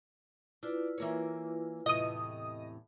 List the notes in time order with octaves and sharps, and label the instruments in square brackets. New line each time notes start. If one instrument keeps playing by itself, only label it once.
[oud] D4 [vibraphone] E4 F4 B4
[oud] E3 A#3 C#5
[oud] E2 A2 C3 [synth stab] D#5 D#6